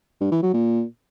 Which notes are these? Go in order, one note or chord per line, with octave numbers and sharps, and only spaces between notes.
G2
E3
F#3
A#2